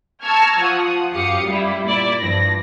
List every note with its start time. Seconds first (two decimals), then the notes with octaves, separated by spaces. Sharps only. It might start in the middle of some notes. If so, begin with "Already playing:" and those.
0.23 A5 A#5 C#6 E6 F6 G#6
0.60 F3 F#5 D#6
1.13 F#2 G4 F5 D#6 C#7
1.45 G3 E4
1.84 A#2 E4 D5
2.19 G2 F3 A#6